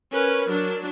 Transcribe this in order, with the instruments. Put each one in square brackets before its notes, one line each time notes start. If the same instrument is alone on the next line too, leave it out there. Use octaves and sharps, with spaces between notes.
[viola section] C#4 B4 [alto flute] A#4
[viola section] F#3 D4